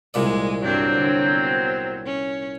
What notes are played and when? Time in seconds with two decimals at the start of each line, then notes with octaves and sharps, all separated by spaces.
0.14 C2 A#2 G#3 D5
0.63 G2 F#3 C4 D4
0.96 D3
1.30 B3
2.05 C#4